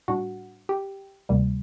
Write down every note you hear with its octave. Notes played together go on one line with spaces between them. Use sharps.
A2 G3 D4 F#4 F#5
G4 G5
D2 C3 D#3 G3 A#3